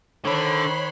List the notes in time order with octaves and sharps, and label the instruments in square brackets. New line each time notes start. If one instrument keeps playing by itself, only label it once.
[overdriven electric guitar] D3 [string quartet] D#3 C5 F#6 [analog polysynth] C#5 B5